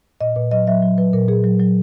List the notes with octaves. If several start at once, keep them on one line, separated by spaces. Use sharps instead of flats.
A#2 D#5
A#2 B4
F#3 D#5
F#3 E5
F#3
F#3 B4
A#2 A#4
A#2 G#4
F#3
F#3